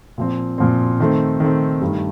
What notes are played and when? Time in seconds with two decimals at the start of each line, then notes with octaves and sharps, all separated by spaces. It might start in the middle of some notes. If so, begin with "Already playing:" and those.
0.18 A#2 F3 C4
0.58 A#2 F3 C4
1.00 D#3 A3 C4
1.40 D#3 A3 C4
1.81 G2 D#3 A3